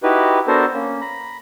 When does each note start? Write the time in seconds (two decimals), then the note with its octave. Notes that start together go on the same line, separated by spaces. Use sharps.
0.03 D#4 E4 F#4 G4 B4
0.47 B3 D4 F#4 A4 A#4 C5
0.74 A#3 C#4
1.01 A#5 B5